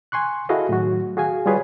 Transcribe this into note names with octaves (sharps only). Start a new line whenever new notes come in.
G#5 C6 C#6 F#6
E4 F#4 G#4 A4 D#5 F5
A2 D#3 F#3 F#4
F#4 G#4 F5 G#5
G3 F4 G4 G#4 B4 C#5